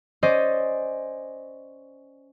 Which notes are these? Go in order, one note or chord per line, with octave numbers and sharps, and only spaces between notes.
C#4 C5 D5 D#5